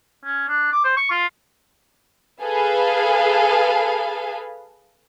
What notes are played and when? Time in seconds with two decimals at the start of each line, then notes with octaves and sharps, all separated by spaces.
0.25 C#4
0.49 D4
0.72 D6
0.84 C5
0.97 C#6
1.11 F4
2.42 G#4 A4 B4 F5